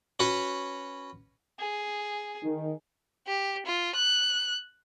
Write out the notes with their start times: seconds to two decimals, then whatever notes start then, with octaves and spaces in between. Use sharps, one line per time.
0.20 C#4 F#4 B4 C#5
1.59 G#4
2.43 D#3
3.27 G4
3.66 F4
3.95 F#6